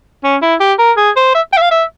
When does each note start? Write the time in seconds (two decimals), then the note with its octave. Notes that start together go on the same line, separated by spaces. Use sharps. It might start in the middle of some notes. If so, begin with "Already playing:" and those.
0.24 C#4
0.42 E4
0.60 G4
0.79 A#4
0.97 G#4
1.16 C5
1.35 E5
1.53 G5
1.57 E5
1.62 F5
1.71 E5